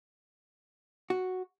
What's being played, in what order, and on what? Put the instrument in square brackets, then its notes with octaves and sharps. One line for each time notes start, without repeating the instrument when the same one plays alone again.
[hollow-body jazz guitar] F#4